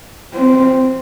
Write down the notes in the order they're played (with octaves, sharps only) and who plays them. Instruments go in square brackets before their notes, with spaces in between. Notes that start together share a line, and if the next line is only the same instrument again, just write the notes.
[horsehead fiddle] C4